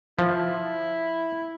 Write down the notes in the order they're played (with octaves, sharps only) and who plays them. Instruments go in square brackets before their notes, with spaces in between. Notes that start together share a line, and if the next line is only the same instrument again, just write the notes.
[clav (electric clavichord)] F3 [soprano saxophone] E4